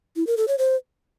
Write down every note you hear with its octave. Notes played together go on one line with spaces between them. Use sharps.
E4
A#4
A4
C#5
C5